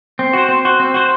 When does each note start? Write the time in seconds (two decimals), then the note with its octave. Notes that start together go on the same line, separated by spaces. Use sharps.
0.19 C4
0.33 F#4 C5
0.49 C4
0.65 F#4 C5
0.80 C4
0.94 F#4 C5